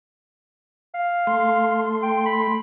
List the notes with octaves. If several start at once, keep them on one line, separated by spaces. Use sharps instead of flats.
F5
A3 C6
G5
B5